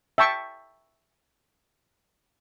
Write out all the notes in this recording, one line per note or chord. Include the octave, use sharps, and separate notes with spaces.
E5 G5 A5 C#6